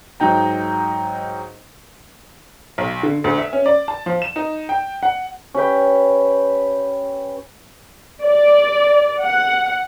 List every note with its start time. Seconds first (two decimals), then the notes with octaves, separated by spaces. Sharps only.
0.20 G#2 F#3 D#4 G5 A#5
2.78 B1
3.03 D3
3.24 D2
3.38 E5
3.53 C#4
3.66 D5
3.88 A5
4.06 F3
4.22 E7
4.36 D#4
4.69 G5
5.03 F#5
5.54 C#4 G4 B4 G5
8.23 D5
9.22 F#5